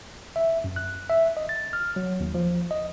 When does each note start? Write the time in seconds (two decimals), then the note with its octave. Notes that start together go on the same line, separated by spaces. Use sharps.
0.36 E5
0.64 F#2
0.76 F#6
1.10 E5
1.37 D#5
1.49 A6
1.73 F6
1.96 F#3
2.20 D#2
2.35 F3
2.71 D#5